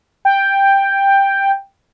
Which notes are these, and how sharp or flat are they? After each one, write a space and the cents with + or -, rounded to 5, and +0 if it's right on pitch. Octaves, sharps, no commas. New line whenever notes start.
G5 +5